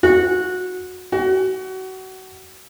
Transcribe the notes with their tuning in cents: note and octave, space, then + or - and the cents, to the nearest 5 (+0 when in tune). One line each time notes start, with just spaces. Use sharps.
F#4 -15
F#4 +30